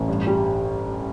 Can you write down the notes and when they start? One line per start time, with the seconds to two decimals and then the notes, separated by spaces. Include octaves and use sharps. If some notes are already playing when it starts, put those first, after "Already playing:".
Already playing: A1
0.08 G2
0.27 G3